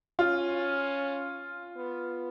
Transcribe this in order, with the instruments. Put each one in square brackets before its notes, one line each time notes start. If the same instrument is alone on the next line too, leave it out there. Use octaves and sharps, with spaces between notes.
[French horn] C#4 [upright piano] F4
[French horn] B3